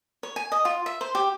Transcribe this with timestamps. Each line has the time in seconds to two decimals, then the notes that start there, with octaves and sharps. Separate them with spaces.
0.23 C#5
0.36 G#5
0.52 D#5
0.65 F4
0.86 E5
1.01 C5
1.15 G4